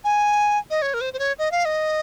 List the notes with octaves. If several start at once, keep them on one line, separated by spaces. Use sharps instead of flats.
G#5
D#5
C#5
A#4
C5
C5
C#5
D#5
F5
D#5